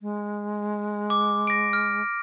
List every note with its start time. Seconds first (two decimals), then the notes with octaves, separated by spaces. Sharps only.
0.01 G#3
1.10 D6
1.47 A#6 D7
1.73 F6